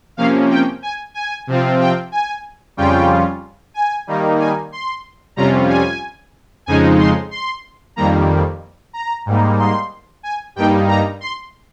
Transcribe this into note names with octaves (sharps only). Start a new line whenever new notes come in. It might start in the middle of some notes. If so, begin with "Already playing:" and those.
C3 F3 A#3 C#4 F5
G5
G#5
G#5
C3 F3 C4 F4
G5
G#5
F2 C#3 G3 C#4 F4 G5
G#5
D#3 G3 A#3 D#4
G#5
C6
F2 C3 G3 C#4 F4 A#5
G#5
F2 C#3 F3 G#3 D#4 G#5
C6
C6
F2 D#3 G3 A#3 A#5
A#5
G#2 G3 A#3 D#4
C6
G#5
G2 G3 A#3 D#4 G5
A#5
C6